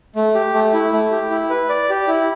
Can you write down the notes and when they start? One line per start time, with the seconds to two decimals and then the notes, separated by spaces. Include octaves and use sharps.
0.16 A3
0.35 G4
0.54 A3
0.74 E4
0.93 A3
1.11 G4
1.31 E4
1.50 B4
1.69 D5
1.90 G4
2.08 E4